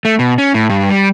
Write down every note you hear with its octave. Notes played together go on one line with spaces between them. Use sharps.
A3
B2
C#4
A2
G2
G3